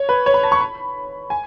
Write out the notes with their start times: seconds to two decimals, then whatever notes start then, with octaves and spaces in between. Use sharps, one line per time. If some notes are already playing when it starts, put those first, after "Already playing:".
Already playing: C#5
0.09 B4
0.26 C#5
0.34 B5
0.43 A5
0.52 C#6
0.61 B5
1.30 G#5